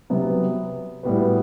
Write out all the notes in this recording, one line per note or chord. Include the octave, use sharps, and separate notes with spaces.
C3 F#3 B3
A2 G3 B3 F#4 B4